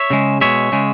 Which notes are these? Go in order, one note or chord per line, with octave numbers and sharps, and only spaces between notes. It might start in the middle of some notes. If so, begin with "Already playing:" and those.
Already playing: C#5 E5
C#3 G#3
B2 G#3 C#5 E5
C#3 G#3